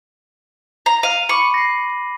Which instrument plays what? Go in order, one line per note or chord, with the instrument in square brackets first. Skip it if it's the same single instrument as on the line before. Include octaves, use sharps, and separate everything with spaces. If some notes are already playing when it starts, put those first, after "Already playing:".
[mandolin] A#5
[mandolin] F5 [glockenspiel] D#7
[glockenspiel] B5 D6 F#7 [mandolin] C#6
[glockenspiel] A#6 C7